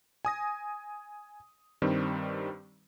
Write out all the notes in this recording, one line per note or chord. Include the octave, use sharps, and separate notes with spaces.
G#5 D#6 A#6
G2 D#3 G3 C4